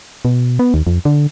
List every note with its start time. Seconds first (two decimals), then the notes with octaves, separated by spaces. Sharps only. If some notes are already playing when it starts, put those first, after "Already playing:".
0.25 B2
0.59 B3
0.74 D#2
0.87 F2
1.05 D3